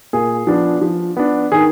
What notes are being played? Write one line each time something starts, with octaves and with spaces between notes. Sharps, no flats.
A#2 G#4
F3 B3 D4
F3
B3 D4
D#3 G#4